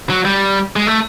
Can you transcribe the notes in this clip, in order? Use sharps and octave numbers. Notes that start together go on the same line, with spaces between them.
F#3
G3
G#3
A3